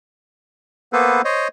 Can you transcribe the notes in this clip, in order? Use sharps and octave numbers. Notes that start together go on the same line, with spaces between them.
A#3 B3 A4 B4 C5
C5 C#5 D#5